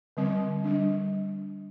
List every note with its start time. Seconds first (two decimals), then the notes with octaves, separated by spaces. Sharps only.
0.17 D3 G3 C4
0.64 G3 D4